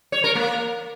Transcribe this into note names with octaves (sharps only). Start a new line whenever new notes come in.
C#5
A#4
A#3